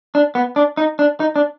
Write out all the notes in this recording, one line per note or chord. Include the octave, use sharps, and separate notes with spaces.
D4
B3
D4
D#4
D4
D#4
D4